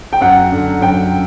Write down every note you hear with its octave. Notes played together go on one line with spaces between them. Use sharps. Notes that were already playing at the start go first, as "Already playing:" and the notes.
G5
F#2 F#5
D3
F#2 G5